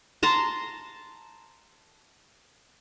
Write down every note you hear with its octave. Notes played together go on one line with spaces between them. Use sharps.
A5 A#5 C6